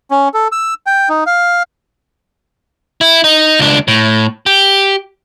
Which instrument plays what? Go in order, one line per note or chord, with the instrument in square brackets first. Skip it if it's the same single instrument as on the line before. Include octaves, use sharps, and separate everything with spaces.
[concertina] C#4
A4
E6
G5
D#4
F5
[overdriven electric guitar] E4
D#4
C#2 D4
A2
G4